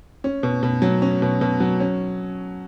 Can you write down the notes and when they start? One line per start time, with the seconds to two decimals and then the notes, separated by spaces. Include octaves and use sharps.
0.24 C#4
0.43 B2
0.63 B2
0.82 F#3
1.02 C#4
1.22 B2
1.41 B2
1.60 F#3
1.80 C#4